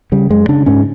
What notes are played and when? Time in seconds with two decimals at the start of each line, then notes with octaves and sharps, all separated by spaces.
0.12 C#3 G3
0.30 F#2 G#3
0.48 C#3 D4
0.66 G#2 C#4